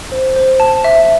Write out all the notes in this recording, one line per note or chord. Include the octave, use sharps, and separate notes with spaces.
C5
C5
A5
E5